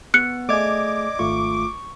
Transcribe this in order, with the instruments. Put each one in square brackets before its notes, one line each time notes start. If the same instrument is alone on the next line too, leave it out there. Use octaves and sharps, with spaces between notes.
[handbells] B3 [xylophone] F#6 C#7
[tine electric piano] A3 G#4 [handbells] D5 D#5 G#6 [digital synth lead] D6
[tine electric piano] G#1 A3 F4 [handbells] C#6